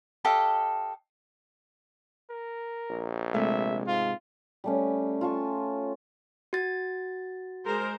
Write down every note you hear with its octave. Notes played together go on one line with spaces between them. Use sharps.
G4 A4 D#5 F5
A#4
A#1
C3 G#3 A3 E5
G#2 F4
G3 A3 C#4
F4 A5 C#6
F#4 A6
G#3 A#4 C5